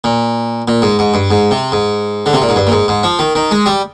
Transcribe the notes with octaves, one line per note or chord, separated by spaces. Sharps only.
A#2
A#2
G#2
G#2
G2
G#2
C3
G#2
D3
C3
A#2
G#2
G2
A#2
G#2
G#2
F3
D#3
D#3
G#3
G3